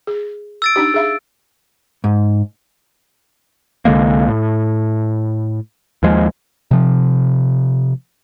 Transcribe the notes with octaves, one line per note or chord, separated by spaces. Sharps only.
G#4
E6 A6 D7
D4 D#4 G4
G#4 E5 F5
G#2
C2 D3 G#3 A#3
A2
D#2 F3 G#3
C3 F3